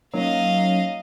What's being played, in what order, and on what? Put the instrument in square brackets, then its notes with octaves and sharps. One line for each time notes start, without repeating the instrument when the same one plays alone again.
[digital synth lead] F#3 [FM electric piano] A#3 C#4 D#4 [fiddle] D#5 F5